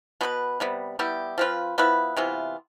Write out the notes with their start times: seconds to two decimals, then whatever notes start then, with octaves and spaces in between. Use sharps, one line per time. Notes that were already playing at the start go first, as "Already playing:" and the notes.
0.21 B2 B3 E4 B4
0.60 C3 G3 B3
0.99 G3 B3 E4 G4
1.38 F3 C4 F4 B4
1.78 F3 B3 E4 B4
2.17 C3 E3 B3 F4